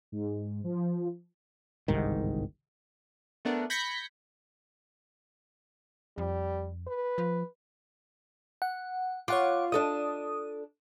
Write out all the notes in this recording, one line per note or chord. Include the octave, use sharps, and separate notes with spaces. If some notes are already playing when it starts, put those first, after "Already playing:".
G#2
F3
G1 C2 G#2 D#3
A3 B3 D4 A#4 F#5
B5 G6 G#6 A#6 B6 C#7
F2 G3
B4
F3
F#5
F4 C#5 F#5 D6
D4 A4 D#5 D#6